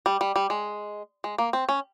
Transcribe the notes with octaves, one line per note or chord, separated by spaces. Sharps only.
G3
G3
G3
G#3
G#3
A#3
C4
C#4